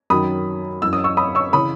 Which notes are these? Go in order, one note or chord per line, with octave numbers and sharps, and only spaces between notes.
F#2 D#3 F#3 B5 D#6
F#2 E3 E6
D#6
C#6 E6
B5 D#6
C#6 E6
C#3 E3 B5 D#6